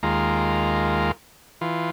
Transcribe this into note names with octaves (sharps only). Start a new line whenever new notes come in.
D#2 G#3 F4 A#4
E3 F4